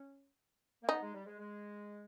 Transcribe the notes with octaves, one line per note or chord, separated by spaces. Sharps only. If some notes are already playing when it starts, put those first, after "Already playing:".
Already playing: C#4
A#3
B3 D#4
G#3
G3
G#3
G#3